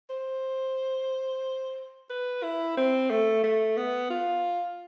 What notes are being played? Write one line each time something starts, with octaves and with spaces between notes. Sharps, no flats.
C5
B4
E4
C4
A3
A3
B3
F4